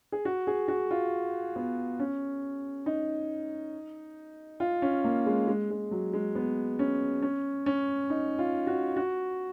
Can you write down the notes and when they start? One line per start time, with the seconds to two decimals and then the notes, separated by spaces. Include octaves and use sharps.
0.12 G#4
0.25 F#4
0.47 G#4
0.68 F#4
0.91 F4
1.56 B3
1.99 C#4
2.86 D#4
4.60 F4
4.82 C#4
5.04 A#3
5.26 G#3
5.48 G#3
5.70 G#3
5.91 F#3
6.13 G#3
6.35 B3
6.79 C#4
7.22 C#4
7.66 C#4
8.10 D#4
8.39 F4
8.67 F#4
8.96 F#4